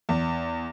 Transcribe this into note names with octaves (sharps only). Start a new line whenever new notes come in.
E2